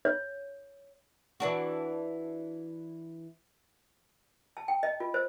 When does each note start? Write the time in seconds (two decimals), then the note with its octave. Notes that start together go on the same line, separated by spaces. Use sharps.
0.05 C#5
1.40 E3 D4 F#4
4.57 A5
4.68 G5
4.83 D#5
5.00 F4
5.14 C5